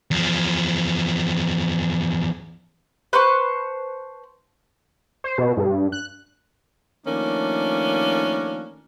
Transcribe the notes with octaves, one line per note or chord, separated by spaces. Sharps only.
E2 F3
B4 C5 A5 C#6
C5
B2
G2
F#6
D#3 F3 A3 A#3 C#4 D4